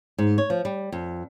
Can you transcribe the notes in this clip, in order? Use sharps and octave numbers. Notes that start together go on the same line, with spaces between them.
G#2
C#5
F3
G3
F2